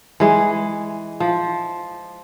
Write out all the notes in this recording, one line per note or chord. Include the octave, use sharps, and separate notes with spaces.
E3 G#3
F3